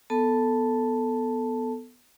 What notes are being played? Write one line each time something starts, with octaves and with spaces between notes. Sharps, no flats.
B3 A4 A5